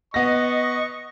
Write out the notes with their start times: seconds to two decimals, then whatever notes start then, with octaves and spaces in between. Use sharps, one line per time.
0.14 B3 D#5 C#6 A#6